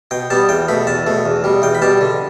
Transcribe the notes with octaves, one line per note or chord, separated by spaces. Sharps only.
B2 G5
G3 B3 A5
E2 G5
B2 A3 B5
E2 A5
B2 A3
E2
B2 G3
E2 G5
B5
B2 G3 A5
D3